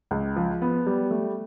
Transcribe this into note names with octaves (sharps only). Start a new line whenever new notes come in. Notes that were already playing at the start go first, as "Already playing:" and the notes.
C#2
F3
B3
G3
A3